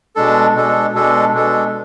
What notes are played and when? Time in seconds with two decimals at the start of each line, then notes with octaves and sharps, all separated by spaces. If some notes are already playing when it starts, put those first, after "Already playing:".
0.16 B2 G#3 D4 A4
0.55 B2 G#3 D4 A4
0.94 B2 G#3 D4 A4
1.33 B2 G#3 D4 A4